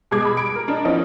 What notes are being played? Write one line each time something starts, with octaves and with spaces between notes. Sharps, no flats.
B2 G3 G#3 G#4 D6 G#6
B5
D7
A#4
D4 A#4 D#5
E3 F3 B3 C#4 D#4